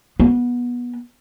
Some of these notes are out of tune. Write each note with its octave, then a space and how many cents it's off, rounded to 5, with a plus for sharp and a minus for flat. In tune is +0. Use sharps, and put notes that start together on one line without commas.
B3 -20